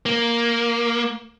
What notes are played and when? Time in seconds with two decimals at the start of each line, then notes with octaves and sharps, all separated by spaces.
0.06 A#3